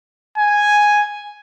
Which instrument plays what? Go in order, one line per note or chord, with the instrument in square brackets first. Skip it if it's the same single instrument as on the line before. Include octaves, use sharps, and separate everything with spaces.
[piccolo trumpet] G#5